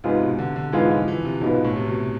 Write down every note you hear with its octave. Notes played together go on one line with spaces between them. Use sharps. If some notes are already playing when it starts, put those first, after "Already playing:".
G#2 C3 G#3 B3 F4
B2
D3
D3
G#2 E3 G#3 B3 F4
F3
E3
C3
G#2 B2 G#3 B3 F4
A2
C3
B2